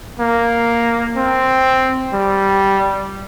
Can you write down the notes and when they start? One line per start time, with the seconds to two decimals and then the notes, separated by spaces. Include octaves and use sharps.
0.20 A#3
1.17 C4
2.13 G3